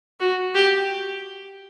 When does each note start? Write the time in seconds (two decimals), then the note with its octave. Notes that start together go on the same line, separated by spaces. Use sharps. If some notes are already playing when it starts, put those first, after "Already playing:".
0.20 F#4
0.55 G4